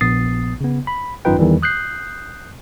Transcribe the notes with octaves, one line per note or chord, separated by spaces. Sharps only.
A#1 B3 D#6 A6 C7
C#3 B3
B5
G#1 F#2 D#4 F4 B4 G5
E2 D#3 E3 G3
D#6 F#6 G6 C7